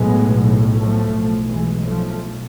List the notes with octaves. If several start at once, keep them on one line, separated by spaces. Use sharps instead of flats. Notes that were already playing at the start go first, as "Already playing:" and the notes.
Already playing: B1 A2 G#3 B3
F3 A3
B1 A2
E3 G#3
F3 A3